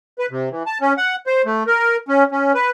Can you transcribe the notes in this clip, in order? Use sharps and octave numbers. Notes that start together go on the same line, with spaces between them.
B4
C3
E3
A5
C#4
F#5
C5
A3
A#4
C#4
C#4
B4